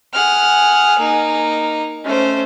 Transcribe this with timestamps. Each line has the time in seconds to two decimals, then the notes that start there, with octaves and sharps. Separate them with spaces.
0.13 G#4 F#5 F6
0.99 A#3 D#4
2.04 A3 C#4 C5